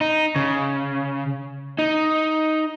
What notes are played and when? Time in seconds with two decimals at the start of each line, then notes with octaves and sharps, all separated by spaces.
0.01 D#4
0.36 C#3
1.79 D#4